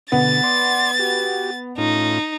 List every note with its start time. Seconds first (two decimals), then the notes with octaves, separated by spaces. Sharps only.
0.12 B2 D3 B3 A6
0.43 D5 C6
0.99 F#4 G4
1.78 A2 C#4 D#4 F4